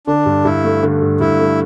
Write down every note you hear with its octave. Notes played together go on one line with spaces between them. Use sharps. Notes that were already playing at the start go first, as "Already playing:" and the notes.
D3 D4
G2
G2 E4
A3
D3
G2
G2 E4
A3